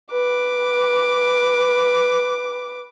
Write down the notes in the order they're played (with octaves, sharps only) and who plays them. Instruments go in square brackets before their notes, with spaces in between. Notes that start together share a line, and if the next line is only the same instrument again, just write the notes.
[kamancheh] B4 D6